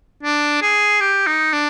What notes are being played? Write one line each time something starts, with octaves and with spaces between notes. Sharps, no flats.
D4
G#4
G4
D#4
D4